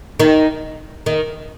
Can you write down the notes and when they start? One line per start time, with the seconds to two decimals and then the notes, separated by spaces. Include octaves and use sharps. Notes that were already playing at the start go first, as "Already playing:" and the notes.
0.20 D#3
1.06 D#3